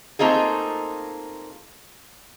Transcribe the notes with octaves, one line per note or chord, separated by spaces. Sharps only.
A3 A#3 C4 D#4 F4 G#4